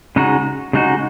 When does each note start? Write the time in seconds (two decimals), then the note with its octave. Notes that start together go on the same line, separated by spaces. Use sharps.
0.16 C#3 G#3 D#4 F#4
0.73 C#3 G#3 D#4 F#4